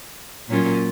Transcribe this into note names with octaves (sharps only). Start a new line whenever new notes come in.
A#2 F#3 A#3 C#4 F4